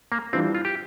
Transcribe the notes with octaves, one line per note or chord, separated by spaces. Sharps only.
A#3
E3 G3 C4 D4 F4
F4
G4